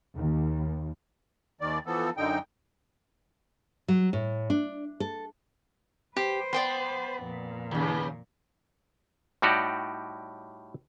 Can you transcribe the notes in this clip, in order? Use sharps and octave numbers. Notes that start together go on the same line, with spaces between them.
D#2
D#2 D#3 D5
E3 F3 B3 A4
F#2 D3 D#4 G5
F#3
A2
D4
A4
G4 B4 C5
B3 D5 G5 C6
F2 A#2
D#2 C#3
A2 G3 D#4 F#4 G4 D5